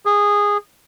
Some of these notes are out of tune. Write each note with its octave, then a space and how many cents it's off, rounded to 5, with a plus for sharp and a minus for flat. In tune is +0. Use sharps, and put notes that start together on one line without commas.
G#4 -15